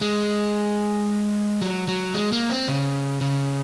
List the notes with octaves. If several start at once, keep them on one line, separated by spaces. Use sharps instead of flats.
G#3
F#3
F#3
G#3
A#3
C4
C#3
C#3